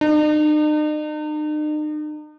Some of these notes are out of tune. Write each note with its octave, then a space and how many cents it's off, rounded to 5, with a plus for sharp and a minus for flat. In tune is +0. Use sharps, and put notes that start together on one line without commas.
D#4 -45